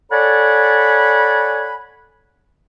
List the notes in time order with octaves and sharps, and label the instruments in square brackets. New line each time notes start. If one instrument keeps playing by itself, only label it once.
[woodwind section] A4 C#5 D5 F#5 G#5 B5